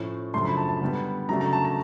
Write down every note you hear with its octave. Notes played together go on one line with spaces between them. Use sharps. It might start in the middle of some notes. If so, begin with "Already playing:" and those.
Already playing: A2 F3 A3 C#4
F#2 C#3 F3 A3 D4 C6
B5
A5
A5
D3 G3 B3
C#3 F#3 A3 D4 A#5
A#5
A5
A#5